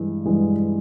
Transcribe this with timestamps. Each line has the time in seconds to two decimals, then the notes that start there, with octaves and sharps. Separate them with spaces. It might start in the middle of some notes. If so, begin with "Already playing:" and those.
Already playing: G2 E3 G#3
0.25 G2 E3 G#3